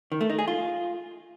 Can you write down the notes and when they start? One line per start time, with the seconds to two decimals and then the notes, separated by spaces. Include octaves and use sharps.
0.12 D#3
0.21 A3
0.30 D#4
0.39 G#4
0.48 F4